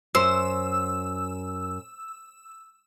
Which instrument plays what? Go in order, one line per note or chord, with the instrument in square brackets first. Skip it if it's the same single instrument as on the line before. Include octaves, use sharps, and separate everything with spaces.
[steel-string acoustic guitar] F#2 [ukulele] C5 [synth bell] E6